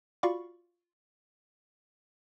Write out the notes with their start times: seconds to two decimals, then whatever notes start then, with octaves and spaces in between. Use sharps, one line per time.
0.23 F4 F#4 D5 F5 B5 C#6